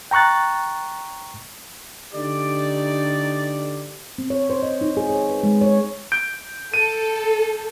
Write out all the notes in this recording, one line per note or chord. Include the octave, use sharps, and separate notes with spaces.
G5 A#5 C#6 F#6 A6
D3 A3 D#4 G4 D5
C4
C#5
C5
D#5
D#4
G#4
C#5
B4
G#3
C#5
G6 D7
A4 D#7